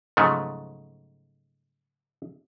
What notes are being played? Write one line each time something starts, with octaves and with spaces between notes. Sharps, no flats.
G#2 C#3 F3 F#3 A3